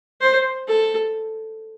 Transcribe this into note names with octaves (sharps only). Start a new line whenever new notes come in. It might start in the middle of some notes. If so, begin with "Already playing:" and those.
C5
A4